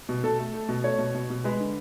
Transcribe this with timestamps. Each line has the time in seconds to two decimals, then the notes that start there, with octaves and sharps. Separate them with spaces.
0.09 B2
0.24 B2 A4
0.39 A3
0.54 A3
0.69 B2
0.84 A3 C#5
0.99 B2
1.15 B2
1.30 B2
1.44 G#3 B4
1.60 D3